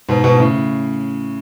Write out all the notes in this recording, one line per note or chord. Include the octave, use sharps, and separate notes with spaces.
G#2 B2
G#2 B2
A2 C#3